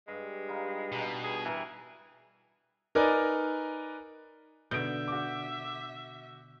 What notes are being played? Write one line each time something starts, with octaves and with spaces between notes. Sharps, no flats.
G2 G#3
G3 D#4 F4
B2 G3 D#4 G4
G#4
E3 A#4
D#4 A#4 B4 D5 G#5
B2 D3 E5 G6 D7
F#4 D6